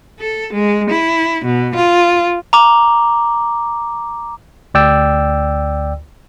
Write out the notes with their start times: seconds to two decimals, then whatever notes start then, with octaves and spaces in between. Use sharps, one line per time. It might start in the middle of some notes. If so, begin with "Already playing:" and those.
0.20 A4
0.54 G#3
0.91 E4
1.46 B2
1.76 F4
2.53 A#5 D6
4.74 D2 D5 G5 E6